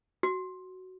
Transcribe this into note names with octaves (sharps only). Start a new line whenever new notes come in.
F#4